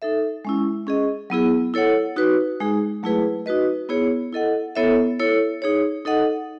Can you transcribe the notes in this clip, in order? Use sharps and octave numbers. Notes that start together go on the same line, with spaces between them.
D#4 A4 E5
G#3 C#4 E4
C#4 G#4 D#5
F#3 B3 E4 G#4
E4 A4 C#5 F#5
D#4 F#4 B4
G#3 D#4 G#4
F#3 A3 E4 G#4 B4
D#4 F#4 B4 D#5
B3 E4 G#4 C#5
E4 A4 D#5 F#5
B3 E4 A4 C#5 E5
E4 A4 C#5
D#4 G#4 C#5
D#4 A4 D#5 F#5